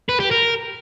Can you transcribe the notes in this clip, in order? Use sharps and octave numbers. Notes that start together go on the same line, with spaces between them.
B4
G4
A#4